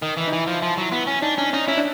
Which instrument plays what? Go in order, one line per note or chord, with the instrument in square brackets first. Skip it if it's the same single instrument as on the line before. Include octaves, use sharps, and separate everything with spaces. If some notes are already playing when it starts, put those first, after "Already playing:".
[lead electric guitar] D#3
E3
[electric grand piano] D#4
[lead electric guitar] E3 [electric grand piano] E4
[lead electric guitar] F3
F3
F#3
B3
C#4
[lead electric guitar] D4 [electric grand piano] D#4
[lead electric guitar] C#4 [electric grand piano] D4
[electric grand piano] C#4 [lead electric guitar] D#4
[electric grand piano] C#4 [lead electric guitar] E4
[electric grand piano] D4